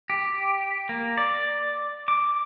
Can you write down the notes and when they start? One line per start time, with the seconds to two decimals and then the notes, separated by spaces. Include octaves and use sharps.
0.10 G4
0.89 A#3
1.18 D5
2.08 D6